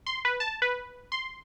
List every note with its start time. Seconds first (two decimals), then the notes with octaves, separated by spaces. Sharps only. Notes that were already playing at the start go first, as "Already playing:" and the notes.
0.06 C6
0.25 B4
0.40 A5
0.62 B4
1.12 C6